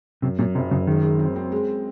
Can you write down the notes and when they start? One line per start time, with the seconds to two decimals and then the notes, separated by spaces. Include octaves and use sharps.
0.22 F#2 C3
0.39 F#2 A#2
0.55 F#1 C3
0.71 F#2 C#3
0.87 D#3 G#3
1.03 G#3
1.19 C4
1.36 C4
1.52 G#3